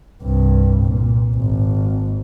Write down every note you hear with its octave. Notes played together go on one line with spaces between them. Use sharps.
C2 G2
A#2
G#1